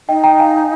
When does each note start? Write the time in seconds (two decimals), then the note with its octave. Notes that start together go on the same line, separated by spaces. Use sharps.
0.09 D#4 D#5 G5
0.24 G5 A#5
0.39 F5 G#5